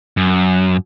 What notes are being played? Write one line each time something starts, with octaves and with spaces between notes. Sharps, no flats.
F#2